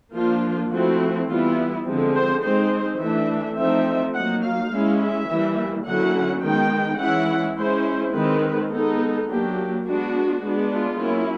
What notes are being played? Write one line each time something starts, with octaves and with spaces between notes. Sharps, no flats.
F3 A#3 D4 F4
F3 A3 C4 E4 F#4
E3 G3 B3 E4 F4
D3 F3 G#3 C4
C5
G#3 C4 D#4 C5
E3 A3 D4 E5
F3 A3 C4 D#4 E5
F#3 A#3 D#4 F#5
F5
G#3 C#4 E4
E5
E3 G3 A#3
D3 F#3 A#3 C#4 E4 F#5
D#3 G#3 B3 D#4 G5
E3 G#3 C#4 E4 F#5
G#3 C#4 E4 C5
D#3 G#3 C4 B4
G#3 B3 D#4 A4
F#3 A#3 D4 G4
G#3 B3 D4 F#4
G#3 B3 D4
F4
F#3 A#3 C#4 E4